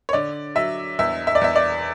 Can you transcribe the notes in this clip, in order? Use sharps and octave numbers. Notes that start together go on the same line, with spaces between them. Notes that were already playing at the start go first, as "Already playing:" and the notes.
C#5
D3 D5
F#3 E5
E2 E5
E5
D5
E2 E5
D5